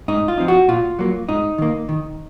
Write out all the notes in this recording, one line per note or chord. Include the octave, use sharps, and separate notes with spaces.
G#2 D#4
F4
F3 C4 D#4
F#4
A#2 F4
F#3 A#3
G#2 D#4
D#3 A#3
D#3